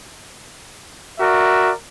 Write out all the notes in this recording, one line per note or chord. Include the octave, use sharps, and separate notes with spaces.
F#4 A#4 D5 E5